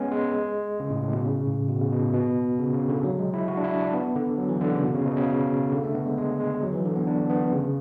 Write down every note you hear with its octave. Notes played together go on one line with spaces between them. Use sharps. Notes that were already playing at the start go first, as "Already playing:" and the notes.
Already playing: G#3 B3 C#4
G#3
C#3
A2
A2
B2
C#3
A2
B2
C#3
B2
A2
B2
C#3
C#3
D3
F#3
G#3
E4
F#4
D4
E4
D4
B3
D3
F#3
E3
D3
C#3
B2
C#3
B2
C#3
D3
A3
B3
G#3
G#3
G#3
F#3
E3
D3
B3
D4
B3
C#3